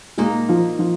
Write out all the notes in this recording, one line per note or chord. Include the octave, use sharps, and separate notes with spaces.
A#2 G#3 A#3 D#4 G#4
F3 F4
F3 F4